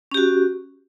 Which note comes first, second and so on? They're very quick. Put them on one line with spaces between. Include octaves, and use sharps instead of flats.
C#4 G4 F#4